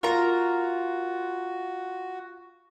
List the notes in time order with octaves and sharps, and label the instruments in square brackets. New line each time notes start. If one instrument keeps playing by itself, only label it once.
[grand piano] F4 [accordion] F#4 [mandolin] A#4 A#5